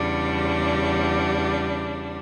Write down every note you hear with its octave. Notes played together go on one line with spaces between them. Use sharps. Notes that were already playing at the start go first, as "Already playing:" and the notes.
Already playing: E2 C#3 G3 D4